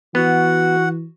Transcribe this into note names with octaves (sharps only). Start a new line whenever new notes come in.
E3 B3 F#4 F#5